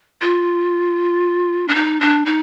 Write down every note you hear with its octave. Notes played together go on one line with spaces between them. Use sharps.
F4
D4
D#4
D4
D#4